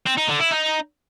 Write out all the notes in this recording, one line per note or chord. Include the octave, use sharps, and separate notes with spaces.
C4
D#4
D3
E4
D#4